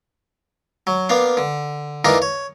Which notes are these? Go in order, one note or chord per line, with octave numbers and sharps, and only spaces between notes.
F#3
A#3 B3 D4 F5
D3
E3 A#3 D4 D#4 F4 A#4
C#5